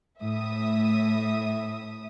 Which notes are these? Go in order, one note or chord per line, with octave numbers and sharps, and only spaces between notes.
A2 E5 D#6